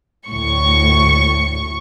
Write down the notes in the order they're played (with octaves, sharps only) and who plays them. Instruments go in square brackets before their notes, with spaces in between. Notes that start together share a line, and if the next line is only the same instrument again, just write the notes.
[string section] D2 A2 C#6